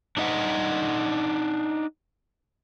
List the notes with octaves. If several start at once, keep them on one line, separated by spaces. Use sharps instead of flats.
D4 D#4 D#5 F#5